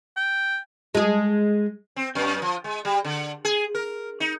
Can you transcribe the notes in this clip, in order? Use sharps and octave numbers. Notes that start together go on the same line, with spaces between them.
G5
G#3 G#4
C4
F#2
F3
G#3
G3
D3
G#4
A#4
D#4